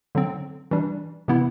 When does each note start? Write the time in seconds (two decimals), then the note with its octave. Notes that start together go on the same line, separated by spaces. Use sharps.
0.15 D3 F#3 C4
0.71 E3 G3 D4
1.28 C3 E3 B3 E4